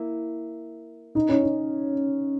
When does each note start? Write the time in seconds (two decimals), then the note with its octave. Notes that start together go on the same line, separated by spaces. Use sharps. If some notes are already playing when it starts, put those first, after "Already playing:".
Already playing: A#3 E4
1.15 D#4
1.29 C#4
1.43 D#4